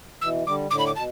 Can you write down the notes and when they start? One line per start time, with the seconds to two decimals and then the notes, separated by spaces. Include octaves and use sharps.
0.21 B2 E3 E6
0.45 D3 G3 D6
0.70 A2 D3 D6
0.79 B5
0.86 D6
0.95 B2 A5